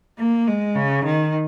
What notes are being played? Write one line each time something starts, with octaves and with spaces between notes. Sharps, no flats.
A#3
G#3
C#3
D#3